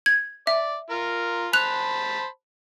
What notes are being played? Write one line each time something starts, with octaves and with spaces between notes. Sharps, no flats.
G#6
D5 E5
F4 A#4
C5 A5 B5 F#6 F7